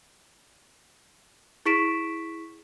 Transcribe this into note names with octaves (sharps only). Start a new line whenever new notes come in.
E4 G#4 C#6 B6 D7 E7